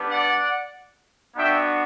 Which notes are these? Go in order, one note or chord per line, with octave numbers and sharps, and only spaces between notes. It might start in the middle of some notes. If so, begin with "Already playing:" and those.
Already playing: G3 B3 D4
D5 F#5
B3 D4 F#4 E5 G5